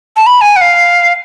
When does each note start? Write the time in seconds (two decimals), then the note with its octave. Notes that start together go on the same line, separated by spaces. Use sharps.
0.16 A5
0.27 B5
0.41 G#5
0.56 F#5
0.61 F5